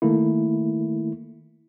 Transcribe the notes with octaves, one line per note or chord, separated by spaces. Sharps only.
D#3 A3 A#3 E4